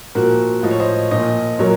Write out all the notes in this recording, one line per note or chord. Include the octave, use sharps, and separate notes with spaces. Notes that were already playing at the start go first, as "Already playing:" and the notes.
A#2 F3 F#4 A#4
A2 F3 D#5
C#5
C5 D#5
A#2 F3 C5 D#5
A#2 F#3 A#4 C#5